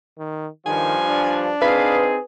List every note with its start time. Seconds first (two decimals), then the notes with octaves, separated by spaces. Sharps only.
0.18 D#3
0.66 G2 D#3 F3 G#5
1.08 D4
1.62 C4 D#4 G#4 B4 F5